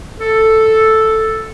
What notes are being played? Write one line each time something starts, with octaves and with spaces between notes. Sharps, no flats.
A4